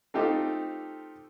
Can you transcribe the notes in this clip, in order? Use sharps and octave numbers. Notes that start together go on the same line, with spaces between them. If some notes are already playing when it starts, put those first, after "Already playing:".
A3 C4 D#4 F4 G4 A4